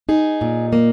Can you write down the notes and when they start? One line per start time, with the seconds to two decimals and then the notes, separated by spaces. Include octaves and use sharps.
0.09 D#4 G#4
0.41 A#2
0.73 A#3